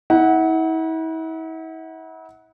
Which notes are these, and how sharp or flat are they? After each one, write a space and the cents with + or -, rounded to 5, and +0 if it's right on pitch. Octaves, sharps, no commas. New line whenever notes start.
E4 -40 F#5 +0